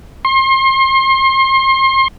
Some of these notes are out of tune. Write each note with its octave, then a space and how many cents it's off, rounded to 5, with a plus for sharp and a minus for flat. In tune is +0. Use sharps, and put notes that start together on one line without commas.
C6 +35